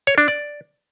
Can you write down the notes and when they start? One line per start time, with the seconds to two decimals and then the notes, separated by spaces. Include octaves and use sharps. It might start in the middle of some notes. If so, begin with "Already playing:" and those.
0.07 C#5
0.18 D4
0.28 D5